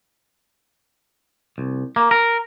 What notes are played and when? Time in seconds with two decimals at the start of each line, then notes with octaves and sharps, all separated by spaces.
1.58 C2
1.96 A#3
2.11 A#4